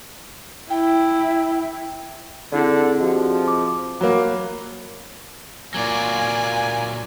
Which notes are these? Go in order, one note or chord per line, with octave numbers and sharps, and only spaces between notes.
E4 G5
D3 C4 E4 G#4 D5
F3 F#4 G4 D#5
D6
F#3 A#3 B5
A#2 F#3 A#3 F4 D5 G#5